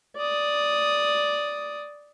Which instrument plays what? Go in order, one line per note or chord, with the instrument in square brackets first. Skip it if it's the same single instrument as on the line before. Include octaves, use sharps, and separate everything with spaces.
[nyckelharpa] D5 D#6